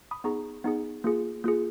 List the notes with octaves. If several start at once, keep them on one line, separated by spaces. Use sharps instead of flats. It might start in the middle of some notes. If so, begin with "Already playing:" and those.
B5 D#6
B3 D#4 G#4 A#5 C#6
B3 D#4 G#4
A#3 F4 G#4
A#3 F4 G#4